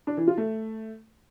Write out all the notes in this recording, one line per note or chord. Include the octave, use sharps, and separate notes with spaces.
D4
E3
F4
A3